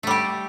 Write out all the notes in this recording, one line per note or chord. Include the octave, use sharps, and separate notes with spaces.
G3 A3 G4